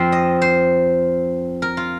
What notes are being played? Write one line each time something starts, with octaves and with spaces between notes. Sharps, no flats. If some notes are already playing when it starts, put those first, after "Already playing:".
Already playing: F2 F3 C4 C5
D#5
C5
A#4
F4